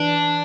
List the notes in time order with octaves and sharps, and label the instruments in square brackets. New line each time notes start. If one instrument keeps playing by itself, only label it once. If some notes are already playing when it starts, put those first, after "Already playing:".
Already playing: [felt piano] E3 [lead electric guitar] D4